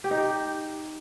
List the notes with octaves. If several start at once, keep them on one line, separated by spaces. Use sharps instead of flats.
G4
D#4
G4